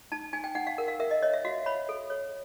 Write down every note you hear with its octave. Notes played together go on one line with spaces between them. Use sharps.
D#4 A5
D#4 G#5
G5
D#4 F#5
F5
A#4 F#5
F5
A#4 E5
D#5
C#5 D#5
E5
F#4 F5
C#5 B5
A4
C#5